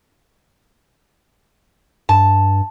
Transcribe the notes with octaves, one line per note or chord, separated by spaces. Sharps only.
G2 A5